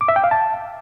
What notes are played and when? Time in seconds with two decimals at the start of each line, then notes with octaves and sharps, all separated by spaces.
0.01 D6
0.08 E5
0.16 G5
0.24 F5
0.31 A5